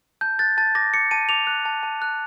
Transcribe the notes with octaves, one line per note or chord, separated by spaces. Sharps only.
A5 G6
F#6 A6
A5 A6
D6 A#6
D6 C#7
A5 D#7
D6 F7
F#6
A5
A5
F#6